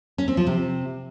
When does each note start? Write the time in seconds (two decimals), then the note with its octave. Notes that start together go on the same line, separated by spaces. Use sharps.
0.18 C#4
0.28 C4
0.37 F3
0.47 C3